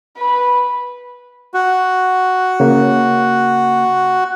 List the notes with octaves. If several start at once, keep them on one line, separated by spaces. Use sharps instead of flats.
B4
F#4
C#3 A#3